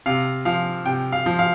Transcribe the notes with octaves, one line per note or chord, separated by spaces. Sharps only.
C3 F5
F3 F5
C3 G5
F5
F3
F5